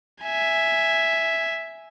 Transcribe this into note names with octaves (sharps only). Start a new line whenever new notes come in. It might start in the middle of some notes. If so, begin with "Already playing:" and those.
E5 G#5